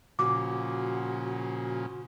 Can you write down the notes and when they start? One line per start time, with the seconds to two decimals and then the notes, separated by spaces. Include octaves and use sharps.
0.19 A#2 C#3 F3 F#4 D6